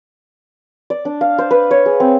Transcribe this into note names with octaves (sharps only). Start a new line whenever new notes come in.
D5
D4
F5
C5
B4
C#5
G#4
C4